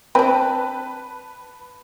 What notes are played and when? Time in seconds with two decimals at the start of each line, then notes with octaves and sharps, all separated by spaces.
0.15 C4 D4 B4 A5